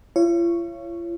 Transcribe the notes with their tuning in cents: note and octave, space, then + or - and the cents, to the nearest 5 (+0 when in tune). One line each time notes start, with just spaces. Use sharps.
F4 -45 C#5 +0